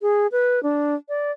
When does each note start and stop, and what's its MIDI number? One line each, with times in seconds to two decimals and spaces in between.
0.02 0.27 68
0.32 0.62 71
0.63 0.95 62
1.09 1.31 74